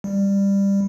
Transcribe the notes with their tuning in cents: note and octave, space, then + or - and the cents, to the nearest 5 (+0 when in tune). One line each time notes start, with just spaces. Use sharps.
G3 +15